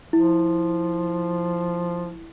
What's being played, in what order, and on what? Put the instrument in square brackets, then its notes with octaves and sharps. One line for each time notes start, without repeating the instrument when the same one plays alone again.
[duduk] F3 [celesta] E4